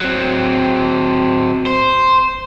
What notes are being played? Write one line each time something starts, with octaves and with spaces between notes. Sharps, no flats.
F#3 C4
C5